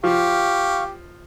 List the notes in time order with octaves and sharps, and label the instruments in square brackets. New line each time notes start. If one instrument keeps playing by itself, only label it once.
[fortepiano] F3 [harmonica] G4 [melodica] F5 C#6